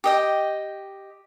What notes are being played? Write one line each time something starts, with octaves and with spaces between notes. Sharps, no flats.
G4 D#5 G5